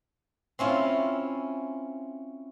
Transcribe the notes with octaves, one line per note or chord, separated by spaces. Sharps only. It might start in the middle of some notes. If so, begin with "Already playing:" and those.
C4 C#4 E4 F4